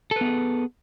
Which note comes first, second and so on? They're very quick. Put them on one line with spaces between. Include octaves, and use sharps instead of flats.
A4 B4 B3 G#4